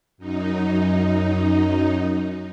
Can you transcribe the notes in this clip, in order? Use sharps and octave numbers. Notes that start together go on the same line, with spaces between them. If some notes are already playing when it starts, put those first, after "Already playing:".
F#2 D#4